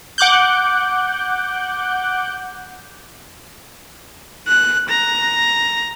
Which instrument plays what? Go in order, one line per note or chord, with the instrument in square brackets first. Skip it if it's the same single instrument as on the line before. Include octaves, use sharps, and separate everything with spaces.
[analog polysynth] F#5 D6 F#6 G6
[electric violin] F#6
A#5